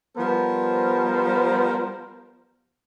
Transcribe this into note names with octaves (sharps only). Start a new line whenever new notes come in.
F3 G3 B3 A#4 C5